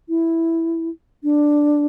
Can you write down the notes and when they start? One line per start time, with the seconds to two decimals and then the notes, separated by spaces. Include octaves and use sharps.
0.09 E4
1.24 D4